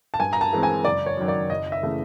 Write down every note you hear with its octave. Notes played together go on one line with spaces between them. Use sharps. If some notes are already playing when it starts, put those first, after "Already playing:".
A5
G2 G#5
A#5
A5
E3 G#3 C4
G#5
F#1 D5
C#5
F#2 D#3 F#3
D5
F#1 D#5
E5
C#3 E3 A3